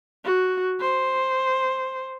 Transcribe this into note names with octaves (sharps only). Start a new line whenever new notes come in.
F#4
C5